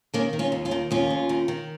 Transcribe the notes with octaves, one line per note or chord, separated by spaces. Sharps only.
D#3 A#3 C#4
D#3
C#4 F4
D#2
C#4 F4
D#3
D#2 C#4 F4
D#2
D#3
D#3